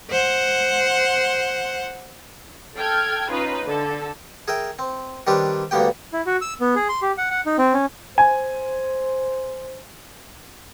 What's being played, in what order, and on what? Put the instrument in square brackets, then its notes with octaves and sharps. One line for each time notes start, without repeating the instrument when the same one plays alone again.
[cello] C5 F#5
[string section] A4 G5 F6 G#6
C#4 D#4 F4 B4
D3 A4
[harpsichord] G#4 A#4 E5 G5
C4
D#3 G3 C4 D4 G4 B4
D2 G2 A#3 B3 G4 G5
[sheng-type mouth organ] E4
F#4
E6
B3
G#4
C6
G4
F#5
F#5
D#4
C4
C#4
[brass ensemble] C5 [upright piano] G#5